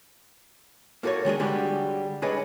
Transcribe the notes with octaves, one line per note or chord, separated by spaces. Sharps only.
A#3 F#4 A4 B4 C#5
D#3 G#3 D4 G#4
D3 G3 G#3 D4 F#4
D4 G#4 A4 B4 C#5 D#5